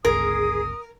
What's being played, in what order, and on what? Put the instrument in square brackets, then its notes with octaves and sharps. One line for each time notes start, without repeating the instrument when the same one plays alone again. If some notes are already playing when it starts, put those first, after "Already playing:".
[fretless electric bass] G1 C#2 [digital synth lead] G#4 [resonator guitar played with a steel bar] A#4 [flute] D#6